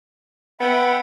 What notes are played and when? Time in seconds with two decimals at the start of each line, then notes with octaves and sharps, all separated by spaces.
0.60 B3 E5 F#5 G5 B5